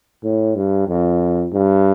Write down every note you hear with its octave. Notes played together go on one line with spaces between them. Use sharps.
A2
G2
F2
G2